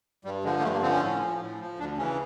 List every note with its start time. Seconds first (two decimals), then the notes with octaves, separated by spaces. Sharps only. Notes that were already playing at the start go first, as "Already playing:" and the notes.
0.24 G2 G3
0.44 D3 F3 G#3
0.59 A#3
0.63 G2 A3
0.73 A#3
0.82 D3 F3 C4
0.92 C#4
1.02 A2
1.21 F3
1.40 A2
1.60 F3
1.79 D2 D4
1.98 C#3 E3 C#4